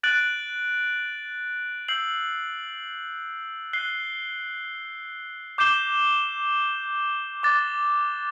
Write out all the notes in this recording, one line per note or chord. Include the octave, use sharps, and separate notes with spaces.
F#6 A6 D7 F#7
E6 G6 C7 F#7
F#6 C7 G7
D6 G6 C7 E7 G7
D6 F#6 A6